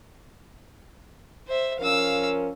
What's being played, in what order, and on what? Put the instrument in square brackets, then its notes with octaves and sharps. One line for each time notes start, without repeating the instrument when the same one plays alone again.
[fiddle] C5 E5
[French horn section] F3 C#4 A#4 [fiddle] F5 E6